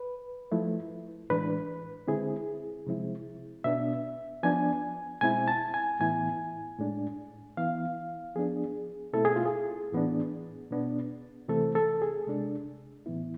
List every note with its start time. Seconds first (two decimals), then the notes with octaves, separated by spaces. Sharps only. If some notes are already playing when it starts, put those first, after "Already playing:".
Already playing: B4
0.52 F3 A3 E4
1.30 A2 E3 G#3 D4 B4
2.08 D3 G#3 C4 E4 G#4
2.87 C3 F3 G#3 C4 E4
3.64 B2 B3 D4 E5
4.43 F3 B3 D4 G#5
5.21 B2 G#3 C4 E4 G#5
5.48 A5
5.74 G#5
6.00 A2 E3 B3 E4 G#5
6.79 A2 G#3 D4
7.57 E3 B3 E4 F5
8.35 F3 B3 D4 G#4
9.13 B2 A3 C4 E4 A4
9.25 G#4
9.36 F4
9.46 G#4
9.92 A2 E3 B3 D4
10.71 B2 B3 D4
11.48 C3 E3 A3 C4 A4
11.75 A4
12.02 G#4
12.27 C3 G#3 D4
13.06 A2 E3 B3 E4